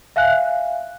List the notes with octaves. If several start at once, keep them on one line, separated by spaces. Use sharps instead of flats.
E5 F5 G#5 F#6